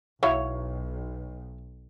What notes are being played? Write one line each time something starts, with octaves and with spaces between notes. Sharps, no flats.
B1 F#3 E4 C#5 E5 F5